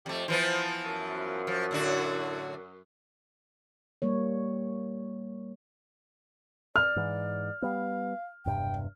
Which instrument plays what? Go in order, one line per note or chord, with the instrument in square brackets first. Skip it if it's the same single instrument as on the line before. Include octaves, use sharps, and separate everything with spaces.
[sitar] F2 A3 [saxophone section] G4
[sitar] E3 F3 B3 [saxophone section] C5
[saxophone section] F#2
[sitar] F3
A2 D3 F#4
[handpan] G3 A#3 C#5
[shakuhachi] D5 [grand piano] F6
[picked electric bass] G#2 E3
[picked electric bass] G3 B3 [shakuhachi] F5
[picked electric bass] E1 G2 C3 [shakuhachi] G5